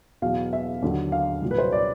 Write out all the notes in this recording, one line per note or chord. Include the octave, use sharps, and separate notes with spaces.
E2 B2 F#3 F5
E5
D#2 D3 F#3
F5
C2 A#2 F#3
B4
C5
C#5
D5